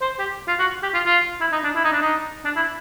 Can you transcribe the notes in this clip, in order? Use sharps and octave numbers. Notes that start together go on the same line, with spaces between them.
C5
G4
F4
F#4
G4
F4
F4
E4
D#4
D4
E4
D#4
D4
D#4
D4
E4